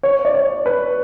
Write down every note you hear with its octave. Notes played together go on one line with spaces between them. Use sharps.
C#5
D5
C#5
B4